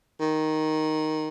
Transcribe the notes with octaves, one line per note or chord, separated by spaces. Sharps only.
D#3